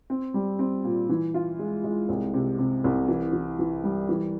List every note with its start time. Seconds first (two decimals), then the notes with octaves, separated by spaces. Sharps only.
0.10 C4
0.34 G3
0.59 C4
0.84 A#2
1.09 E3
1.34 F4
1.59 G#3
1.84 G#3
2.09 C2
2.34 C3
2.58 C3
2.84 C2
3.08 E3
3.33 E3
3.59 E3
3.84 G3
4.09 E3